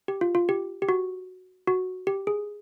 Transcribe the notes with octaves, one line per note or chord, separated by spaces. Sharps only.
G4
F4
F4
G4
G4
F#4
F#4
G4
G#4